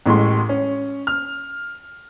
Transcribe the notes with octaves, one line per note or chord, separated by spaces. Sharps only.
A1 A2 G#3 C6
C#4
F6